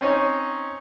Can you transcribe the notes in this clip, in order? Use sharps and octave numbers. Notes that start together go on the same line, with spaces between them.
C4 C#4 D#4 C#5